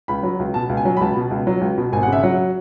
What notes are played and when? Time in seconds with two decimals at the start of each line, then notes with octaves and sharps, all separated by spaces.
0.08 C#2 B5
0.23 F#3
0.39 C#2
0.54 B2 A5
0.69 C#2
0.77 G#5
0.85 F#3
0.97 B5
1.01 C#2 A5
1.16 B2
1.31 C#2
1.47 F#3
1.61 C#2
1.78 B2
1.92 G#1 G#5
2.03 F#5
2.08 C#3 E5
2.23 F#3 F#5